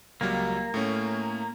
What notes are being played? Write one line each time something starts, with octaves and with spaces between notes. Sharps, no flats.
C#2 F#3 G3 A#3
A2 A3 C#4